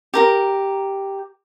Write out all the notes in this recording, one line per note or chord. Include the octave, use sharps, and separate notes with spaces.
G4 A#4 A#5